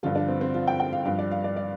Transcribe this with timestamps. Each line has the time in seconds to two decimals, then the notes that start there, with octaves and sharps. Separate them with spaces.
0.03 G2 D3 F3 F4
0.16 D4
0.28 C4
0.41 C4
0.54 F4
0.67 G5
0.80 G5
0.93 F5
1.05 G2 F3 F5
1.19 D5
1.31 F5
1.44 D5
1.56 D5